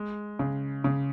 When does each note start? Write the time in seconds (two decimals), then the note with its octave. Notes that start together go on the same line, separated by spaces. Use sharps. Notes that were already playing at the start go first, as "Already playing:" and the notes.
Already playing: G#3
0.39 C#3
0.84 C#3